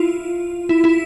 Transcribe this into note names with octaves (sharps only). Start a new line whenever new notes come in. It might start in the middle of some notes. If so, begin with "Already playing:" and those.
Already playing: E4 F4
E4
E4